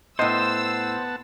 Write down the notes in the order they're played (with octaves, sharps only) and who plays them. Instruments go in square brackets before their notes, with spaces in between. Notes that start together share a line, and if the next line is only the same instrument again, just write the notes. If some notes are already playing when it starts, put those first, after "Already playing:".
[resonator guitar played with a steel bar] A2 D#5 [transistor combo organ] B3 F#5 A5 [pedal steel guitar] C5 [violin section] E6